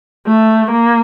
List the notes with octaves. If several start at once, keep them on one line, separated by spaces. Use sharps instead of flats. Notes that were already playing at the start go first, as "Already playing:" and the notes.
A3
A#3